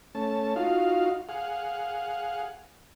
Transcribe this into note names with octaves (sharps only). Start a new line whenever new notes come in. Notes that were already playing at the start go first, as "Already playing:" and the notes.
A3 C#4 A5
D#4 F4 F#4 F5
G#4 F5 F#5